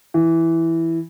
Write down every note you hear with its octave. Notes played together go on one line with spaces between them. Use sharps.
E3